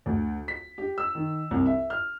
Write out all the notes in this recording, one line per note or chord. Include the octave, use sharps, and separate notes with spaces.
D2
B6
G4
E6
D#3
C2
E5
F6